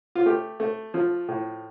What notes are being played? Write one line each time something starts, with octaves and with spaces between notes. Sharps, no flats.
F4
A3 G4
A3
F3
A2